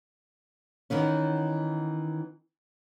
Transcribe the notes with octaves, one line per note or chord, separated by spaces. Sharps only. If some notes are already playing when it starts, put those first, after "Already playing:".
D#3 E3 B3 C#4